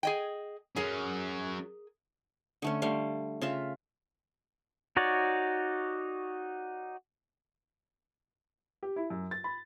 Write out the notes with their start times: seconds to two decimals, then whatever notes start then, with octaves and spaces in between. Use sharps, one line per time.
0.03 G#4 D#5 G5
0.76 F#3 C#4 G#4 A#4
2.62 D3 A3 C#4
2.82 D3 G3 A3 F5
3.41 C#3 F4 E5
4.97 D#4 F#4 C#5 D5
8.83 G4
8.96 E4
9.10 F#2
9.31 A6
9.44 B5